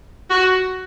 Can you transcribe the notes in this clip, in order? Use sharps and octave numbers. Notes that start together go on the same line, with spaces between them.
F#4